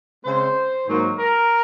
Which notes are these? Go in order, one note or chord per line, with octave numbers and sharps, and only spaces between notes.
C#3 G#3 C4 C5
G#2 D#3 F#3 A#3
A#4